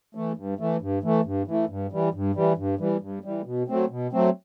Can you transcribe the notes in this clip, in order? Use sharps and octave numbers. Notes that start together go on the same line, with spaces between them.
E3 A3
G2
E3 A3
G2
E3 A3
G2
E3 A3
G2
E3 G3
G2
E3 G3
G2
E3 G3
G2
E3 G3
B2
F#3 A3 C4
B2
F#3 A3 C4